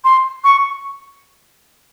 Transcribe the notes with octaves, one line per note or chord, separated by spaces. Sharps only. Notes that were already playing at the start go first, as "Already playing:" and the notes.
C6
C#6